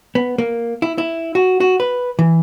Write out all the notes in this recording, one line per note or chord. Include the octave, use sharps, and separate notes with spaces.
B3
A#3
E4
E4
F#4
F#4
B4
E3